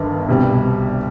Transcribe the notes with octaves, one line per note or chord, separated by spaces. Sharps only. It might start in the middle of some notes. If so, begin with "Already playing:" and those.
Already playing: G1 G2 D#3
C2 B2 G3 C4